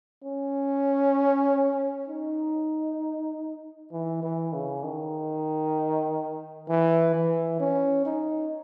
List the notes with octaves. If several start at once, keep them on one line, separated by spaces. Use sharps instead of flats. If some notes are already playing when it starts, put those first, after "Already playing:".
C#4
D#4
E3
E3
C#3
D#3
E3
E3
C#4
D#4